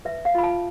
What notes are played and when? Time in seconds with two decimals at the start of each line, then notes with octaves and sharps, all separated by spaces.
0.05 B4 E5
0.25 F5
0.35 F4 B5
0.43 A5